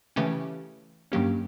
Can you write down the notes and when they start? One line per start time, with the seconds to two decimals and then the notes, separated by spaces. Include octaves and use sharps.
0.16 C#3 E3 A3 C#4 G4
1.12 G2 D#3 F#3 A#3 C#4 G4